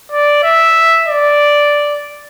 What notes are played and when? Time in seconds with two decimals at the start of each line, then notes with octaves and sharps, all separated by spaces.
0.12 D5
0.44 E5
1.08 D5